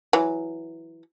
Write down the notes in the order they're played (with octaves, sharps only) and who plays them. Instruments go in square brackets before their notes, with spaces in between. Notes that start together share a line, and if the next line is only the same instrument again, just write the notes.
[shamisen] E3 F#3